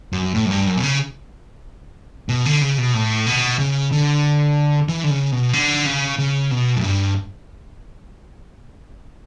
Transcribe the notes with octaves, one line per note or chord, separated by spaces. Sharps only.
F#2
A2
F#2
G2
F#2
B2
C#3
B2
D3
C#3
B2
A2
B2
C#3
D3
E3
D3
C#3
B2
D3
C#3
C#3
B2
F#2
G2